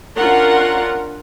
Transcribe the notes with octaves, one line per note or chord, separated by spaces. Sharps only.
C#4 D4 F4 A#4 F#5